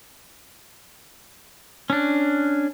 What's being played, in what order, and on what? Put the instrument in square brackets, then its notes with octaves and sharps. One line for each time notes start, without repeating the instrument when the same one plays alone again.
[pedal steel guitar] C#4 D4